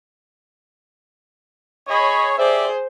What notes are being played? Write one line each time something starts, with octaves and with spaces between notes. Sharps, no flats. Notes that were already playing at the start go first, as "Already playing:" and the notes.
G#4 C#5 D#5 B5
G4 G#4 C5 D5 E5